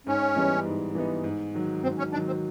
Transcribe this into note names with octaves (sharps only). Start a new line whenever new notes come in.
G#2 C#4
E3 G3 B3 D#4
G#2
E3 G3 B3 D#4
G#2
D#3 F#3
G#2 C4
C#4
D#3 F#3 D4
C4